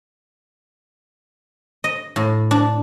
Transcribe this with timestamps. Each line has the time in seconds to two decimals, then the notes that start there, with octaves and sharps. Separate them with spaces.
1.84 D#5
2.16 A2
2.51 D4